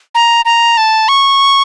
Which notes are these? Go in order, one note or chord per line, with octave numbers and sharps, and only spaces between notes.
A#5
A#5
A5
C#6